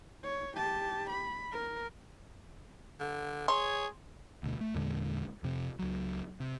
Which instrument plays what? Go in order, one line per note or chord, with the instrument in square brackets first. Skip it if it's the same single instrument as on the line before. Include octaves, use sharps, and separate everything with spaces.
[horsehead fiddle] C#5
G4 A5
B5
A#4
[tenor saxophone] D3
[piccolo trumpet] G#4 [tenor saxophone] C#5 [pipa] C6
[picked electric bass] D2 B2
A3
E2 A#2 D3 G#3
F2 C3
C#2 F#3
C3